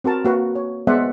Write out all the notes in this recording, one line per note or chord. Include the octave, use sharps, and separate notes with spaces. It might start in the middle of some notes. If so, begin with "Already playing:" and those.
C4 F#4 A#4 A5
A#3 F#4 B4
C#5
G#3 B3 C5 D5 E5 F#5